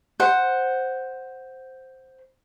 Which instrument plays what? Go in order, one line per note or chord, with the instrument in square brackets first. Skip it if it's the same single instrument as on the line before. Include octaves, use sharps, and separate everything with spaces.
[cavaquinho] C5 F#5